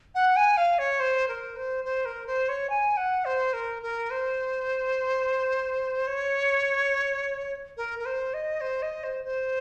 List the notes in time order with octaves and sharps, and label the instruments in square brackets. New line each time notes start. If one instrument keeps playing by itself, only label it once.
[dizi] F#5
G#5
F5
C#5
C5
A#4
C5
C5
A#4
C5
C#5
G#5
F#5
C5
A#4
A#4
C5
C#5
A#4
A#4
C5
D#5
C5
D#5
C5
C5